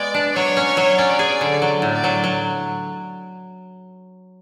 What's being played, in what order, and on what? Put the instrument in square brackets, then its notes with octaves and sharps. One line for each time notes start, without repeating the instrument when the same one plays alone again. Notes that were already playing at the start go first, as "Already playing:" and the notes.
Already playing: [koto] G#3 B3 [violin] D5
[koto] D4
[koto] F#3 [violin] C#5
[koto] C#4
F#3
[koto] C#4 [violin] D5
[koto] G#4
D3
F#3
A2
[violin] D5
[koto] F#3
F#3